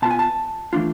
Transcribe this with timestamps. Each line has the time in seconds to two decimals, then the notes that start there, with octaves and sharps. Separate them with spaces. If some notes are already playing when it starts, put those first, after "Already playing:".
0.02 B2 B3 F4 A5
0.11 G#5
0.19 A5
0.73 E3 A3 D4 F4